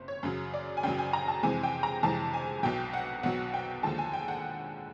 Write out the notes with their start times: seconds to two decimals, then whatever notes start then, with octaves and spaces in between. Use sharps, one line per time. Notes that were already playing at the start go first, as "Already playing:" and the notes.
Already playing: F#1 C3 C5
0.08 C#5
0.23 F#2 C#3 F#3
0.54 D5
0.77 G#5
0.83 F#2 C#3 F#3 G5
0.98 G#5
1.13 A#5
1.28 A5
1.43 F2 C3 E3 G#3 G#5
1.63 G5
1.83 A#5
2.03 F2 C3 E3 G#3 A5
2.34 G#5
2.63 B1 B2 F#3 G5
2.93 F#5
3.23 B1 B2 F#3 F#5
3.54 G5
3.83 D#2 D3 F3 G#3 A5
3.98 G#5
4.13 G5
4.28 F#5